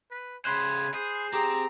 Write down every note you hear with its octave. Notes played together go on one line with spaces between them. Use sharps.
B4
C#3 C5 G#5 B5 C6 F#6
G#4 C5
C4 G4 G#4 A#5